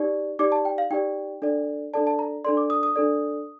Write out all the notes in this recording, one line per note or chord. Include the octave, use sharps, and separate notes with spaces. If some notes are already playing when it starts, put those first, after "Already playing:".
Already playing: D#4 G4 D5
D#4 G4 D5 D6
A5
G5
F5
D#4 G4 D5 G5
D4 A4 D5
D4 A4 D5 A5
A5
A#5
D4 A4 D5 C6
D6
D#6
D#6
D4 A4 D5